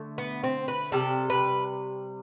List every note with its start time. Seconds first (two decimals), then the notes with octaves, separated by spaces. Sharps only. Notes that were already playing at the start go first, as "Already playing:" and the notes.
Already playing: D3 A3
0.18 B3
0.44 C4
0.68 B4
0.92 C3 G3 A4
1.30 B4